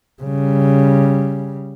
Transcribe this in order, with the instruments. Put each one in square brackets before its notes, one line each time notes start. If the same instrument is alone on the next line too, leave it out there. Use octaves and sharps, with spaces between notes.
[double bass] C#3 G3